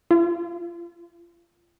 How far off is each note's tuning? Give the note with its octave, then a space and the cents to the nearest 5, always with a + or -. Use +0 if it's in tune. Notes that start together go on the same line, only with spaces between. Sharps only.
F4 -30